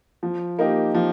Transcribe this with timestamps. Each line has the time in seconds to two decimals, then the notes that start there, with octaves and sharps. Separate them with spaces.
0.23 F3
0.59 A#3 D#4 G4
0.94 F3